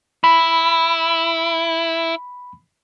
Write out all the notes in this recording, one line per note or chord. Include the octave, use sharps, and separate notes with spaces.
E4 B5